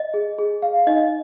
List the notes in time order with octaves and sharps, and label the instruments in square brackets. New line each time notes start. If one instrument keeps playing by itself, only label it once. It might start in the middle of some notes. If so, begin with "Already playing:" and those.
Already playing: [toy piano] D#5
[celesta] G#4
G#4
F5
[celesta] D#4 [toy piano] D#5